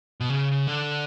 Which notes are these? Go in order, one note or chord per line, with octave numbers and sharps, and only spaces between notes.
B2
C#3
D3